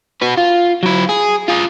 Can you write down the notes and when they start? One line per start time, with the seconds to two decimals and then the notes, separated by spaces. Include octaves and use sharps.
0.21 F#4 B4
0.38 F4
0.83 F#3 E4
1.09 G#4
1.48 F4 G#4